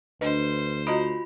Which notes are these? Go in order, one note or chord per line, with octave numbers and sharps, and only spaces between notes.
D2 D4 B4 C5 D#5
F4 F#4 D#5 A#5 B5